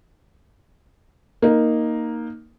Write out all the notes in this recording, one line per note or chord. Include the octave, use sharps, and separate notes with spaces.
A#3 D#4 A#4